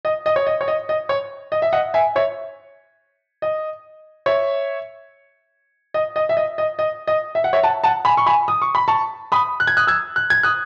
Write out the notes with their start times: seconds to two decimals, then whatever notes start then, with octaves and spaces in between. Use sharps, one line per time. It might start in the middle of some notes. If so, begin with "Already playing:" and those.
0.05 D#5
0.26 D#5
0.36 C#5
0.47 D#5
0.61 C#5
0.68 D#5
0.89 D#5
1.09 C#5
1.52 D#5
1.62 E5
1.73 D#5 F#5
1.94 E5 G#5
2.16 C#5 E5
3.42 D#5
4.26 C#5 E5
5.94 D#5
6.16 D#5
6.29 E5
6.37 D#5
6.58 D#5
6.79 D#5
7.07 D#5
7.35 E5
7.44 F#5
7.53 C#5 E5
7.63 F#5 A5
7.84 F#5 A5
8.05 G#5 B5
8.17 C#6
8.26 G#5 B5
8.48 D#6
8.62 C#6
8.75 B5
8.88 A5 C#6
9.32 B5 D#6
9.60 F#6
9.67 G#6
9.77 D#6 F#6
9.87 E6 G#6
10.16 F#6
10.30 G#6
10.43 D#6 F#6